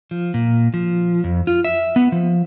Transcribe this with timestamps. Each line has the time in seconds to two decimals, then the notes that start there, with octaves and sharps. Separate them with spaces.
0.11 F3
0.34 A#2
0.74 F3
1.24 F2
1.47 F4
1.64 E5
1.96 B3
2.12 F3